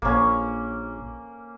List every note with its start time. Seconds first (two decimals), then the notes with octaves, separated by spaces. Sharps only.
0.02 A#1 A#3 C#4